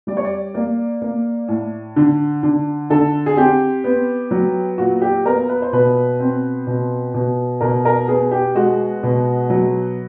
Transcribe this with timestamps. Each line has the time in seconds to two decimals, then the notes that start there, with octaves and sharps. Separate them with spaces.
0.07 G3 D5
0.17 C#5
0.25 D5
0.54 A#3 D5
1.02 A#3
1.48 A2
1.96 D3
2.43 D3
2.90 D3 A4
3.26 G#4
3.37 C4 G4
3.84 B3
4.31 F#3
4.78 A#2 F#4
5.02 G4
5.25 B3 A#4
5.49 B4
5.62 C5
5.72 B2 B4
6.20 C4
6.67 B2
7.14 B2
7.61 B2 A#4
7.85 A#4
8.08 B3 G#4
8.31 G4
8.55 G#3 F#4
9.03 B2
9.50 F#3